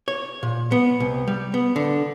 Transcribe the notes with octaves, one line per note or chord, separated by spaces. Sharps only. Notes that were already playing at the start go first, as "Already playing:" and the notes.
C#5
A#2
B3
C2
G3
B3
D3